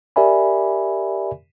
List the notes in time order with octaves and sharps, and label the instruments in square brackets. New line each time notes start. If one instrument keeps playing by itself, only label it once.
[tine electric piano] G4 A#4 D5 E5 G#5 B5